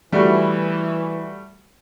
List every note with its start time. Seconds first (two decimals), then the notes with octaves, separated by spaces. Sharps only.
0.12 E3 G3 A3 F#4